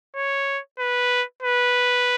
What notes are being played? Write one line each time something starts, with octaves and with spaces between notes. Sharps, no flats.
C#5
B4
B4